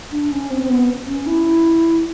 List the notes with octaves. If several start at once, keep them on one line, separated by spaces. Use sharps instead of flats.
D4
C#4
C4
C4
B3
C#4
E4